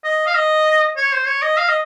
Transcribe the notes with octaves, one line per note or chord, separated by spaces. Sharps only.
D#5
F5
D#5
C#5
C5
C#5
D#5
F5
D#5